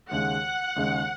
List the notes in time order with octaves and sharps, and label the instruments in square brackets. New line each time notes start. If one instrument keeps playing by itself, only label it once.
[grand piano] D#2 C#3 G#3 [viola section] F#5
[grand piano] D#2 C#3 G#3